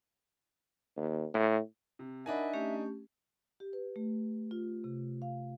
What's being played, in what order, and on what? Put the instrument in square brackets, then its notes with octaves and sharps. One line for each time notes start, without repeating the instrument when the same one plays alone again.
[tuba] D#2
A2
[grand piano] C3
[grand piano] D4 D#4 G#5 [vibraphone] A#4 F#5 B5 [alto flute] E5
[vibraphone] A3 C#4 G4
[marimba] G4
B4
A3
F4
C3
F5